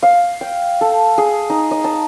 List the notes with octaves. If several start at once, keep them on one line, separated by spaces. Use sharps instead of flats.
F5
G5
A4
G#4
D#4
D#5
A5